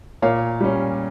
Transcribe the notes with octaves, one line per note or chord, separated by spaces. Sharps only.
A#2 C#5 F5
G3 C#4